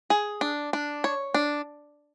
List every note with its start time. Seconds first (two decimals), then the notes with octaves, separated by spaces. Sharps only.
0.10 G#4
0.41 D4
0.73 D4
1.04 C#5
1.34 D4